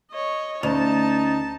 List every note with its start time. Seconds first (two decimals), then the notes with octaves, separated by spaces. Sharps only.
0.11 C#5 D#5
0.63 D2 C#4 D#4 A5